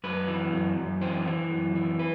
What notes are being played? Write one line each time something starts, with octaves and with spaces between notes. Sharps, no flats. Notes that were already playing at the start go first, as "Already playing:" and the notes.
F#2 B4
E3
F#2
F#2
E3 C5
E3
F#2
E3
B4